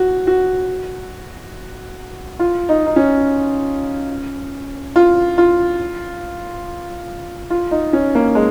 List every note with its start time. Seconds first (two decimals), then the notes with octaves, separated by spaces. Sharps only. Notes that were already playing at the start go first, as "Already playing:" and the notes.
Already playing: F#4
0.27 F#4
2.40 F4
2.69 D#4
2.86 D#4
2.96 C#4
4.96 F4
5.38 F4
7.50 F4
7.71 D#4
7.93 C#4
8.15 A#3
8.35 G#3